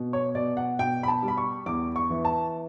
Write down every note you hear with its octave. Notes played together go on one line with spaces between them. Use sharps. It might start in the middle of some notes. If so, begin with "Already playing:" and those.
Already playing: B2
C#5
B2 D5
F#5
B2 G5
B5
A5
G3
B5
C#6
E2 D6
C#6
E3
A5